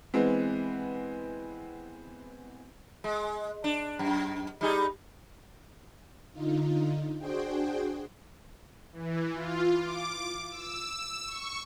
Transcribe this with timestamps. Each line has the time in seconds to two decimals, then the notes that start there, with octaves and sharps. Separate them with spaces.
0.14 E3 G#3 B3 C4
3.04 G#3
3.64 D4
3.99 F#2
4.61 G3 D#4 G#4
6.32 D3 D#4 F4
7.18 D4 F#4 G#4 C5 G5
8.93 E3
9.34 F4
9.80 D6
10.51 E6
11.27 C#6